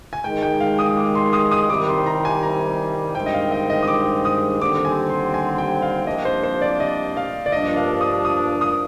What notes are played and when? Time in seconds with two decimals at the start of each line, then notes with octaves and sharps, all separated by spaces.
0.13 G#5
0.24 G#2 D#3 G#3 G5
0.43 G5
0.60 F5
0.79 D#6
0.97 D6
1.15 C6
1.33 D#6
1.51 D#6
1.69 C2 C3 D#3 G3 D6
1.88 C6
2.06 A#5
2.25 G#5
2.43 A#5
3.15 G2 D#3 G#3 C4 G5
3.26 D#5
3.34 F5
3.52 D#5
3.70 D#5
3.83 D#6
3.88 D6
4.25 D#6
4.61 D#2 D3 G3 C4 D6
4.85 G#5
5.09 C6
5.34 G#5
5.58 G5
5.82 F5
6.07 C2 C3 F3 A#3 D4 D#5
6.25 C5
6.44 C5
6.61 D5
6.80 D#5
7.17 F5
7.46 D5
7.52 G2 F3 A#3 D4 D#5
7.76 F5
8.01 D#6
8.25 D#6
8.61 D#6